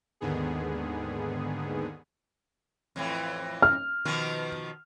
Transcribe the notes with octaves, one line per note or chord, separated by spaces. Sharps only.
D#2 G#2 D3 D#3 B3 G#4
F2 A2 E3
F6
B2 D#3 F3